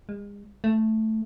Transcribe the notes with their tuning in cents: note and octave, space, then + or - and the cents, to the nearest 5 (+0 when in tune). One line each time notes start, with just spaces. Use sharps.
G#3 -40
A3 +0